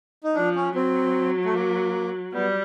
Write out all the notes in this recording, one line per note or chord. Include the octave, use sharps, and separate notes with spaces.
D#4
F3 D4
C#4
F#3 C4
A3
A#3
G3 B3